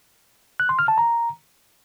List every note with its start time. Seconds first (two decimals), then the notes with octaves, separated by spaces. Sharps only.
0.60 F#6
0.69 C6
0.79 F6
0.88 A5
0.98 A#5